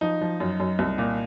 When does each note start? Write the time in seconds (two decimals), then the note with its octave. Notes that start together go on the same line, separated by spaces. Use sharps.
0.01 F3 D#4
0.21 F3
0.40 F#2
0.60 F#2
0.79 C2
0.98 A#2